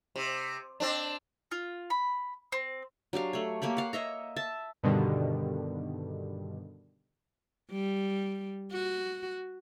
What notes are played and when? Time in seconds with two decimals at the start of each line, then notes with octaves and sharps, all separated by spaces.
0.16 C3
0.80 C4 D4
1.51 F4
1.90 B5
2.52 C4
3.13 F#3 D4 G4 F5
3.33 A3 C#5
3.62 A#3 G4 C#5 B5
3.77 F5 F#5
3.93 C#5 D#5 E5 A#5
4.36 E5 A5
4.83 G2 B2 D3 D#3 G3
7.71 G3
8.72 F#4